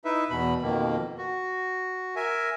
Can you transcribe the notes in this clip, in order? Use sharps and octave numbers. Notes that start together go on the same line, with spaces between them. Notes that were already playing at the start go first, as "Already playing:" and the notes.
D#4 E4 B4 E5
E2 B2 B5
F2 B2 D#3 A#3
F#4
A#4 E5 G#5